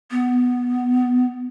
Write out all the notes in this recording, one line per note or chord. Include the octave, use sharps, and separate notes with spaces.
B3